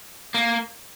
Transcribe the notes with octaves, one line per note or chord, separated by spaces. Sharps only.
A#3